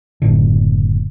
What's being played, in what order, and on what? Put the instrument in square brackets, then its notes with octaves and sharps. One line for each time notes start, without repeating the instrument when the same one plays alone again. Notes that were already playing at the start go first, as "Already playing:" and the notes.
[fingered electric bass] F#1 A2 D3